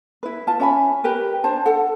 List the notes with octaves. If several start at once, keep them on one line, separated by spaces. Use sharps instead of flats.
E4 B4
F4 A5
C#4 E5 G#5 B5
G4 A#4 B4
D4 C5 A5
A4 F#5